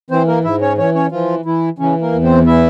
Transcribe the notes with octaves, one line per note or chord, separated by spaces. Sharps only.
E3 C4 C5
A#3 A#4
G#2 E4 E5
C#4 C#5
E3 C#4 C#5
C#4 C#5
E3 F3 F4
E3 E4
C#3 E3 C#4
A#3 A#4
E2
C4 C5
E3 E4 E5